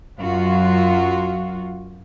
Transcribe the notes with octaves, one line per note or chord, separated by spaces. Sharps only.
F#2 F#3 F4 F#4